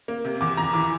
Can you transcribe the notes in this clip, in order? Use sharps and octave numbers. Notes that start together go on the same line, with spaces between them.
A#3
C3
E2 D6
E2 A#5
E3 D6